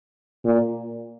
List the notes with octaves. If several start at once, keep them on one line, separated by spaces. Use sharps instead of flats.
A#2